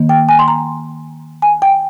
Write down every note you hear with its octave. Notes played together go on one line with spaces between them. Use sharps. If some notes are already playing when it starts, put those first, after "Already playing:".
Already playing: D#3 A#3
G5
G#5
C6
A#5
G#5
G5